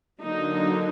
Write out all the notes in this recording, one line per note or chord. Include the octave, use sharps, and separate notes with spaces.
D3 F#3 A#3 D4 D#4